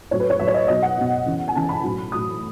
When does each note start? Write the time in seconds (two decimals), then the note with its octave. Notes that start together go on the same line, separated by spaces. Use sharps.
0.11 A2 F#3 C#5
0.20 B4
0.30 C#5
0.39 A2 F#3 E5
0.48 C#5
0.54 D#5
0.68 B2 F#3 D#5
0.82 F#5
0.97 B2 F#3
1.26 C#3 E3
1.48 G#5
1.55 C#3 E3 A5
1.69 B5
1.83 A2 F#3
2.12 A2 F#3 D#6